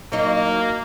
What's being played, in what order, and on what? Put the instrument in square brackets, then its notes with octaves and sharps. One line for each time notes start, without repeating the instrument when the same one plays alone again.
[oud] F#3 D#4 [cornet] A#3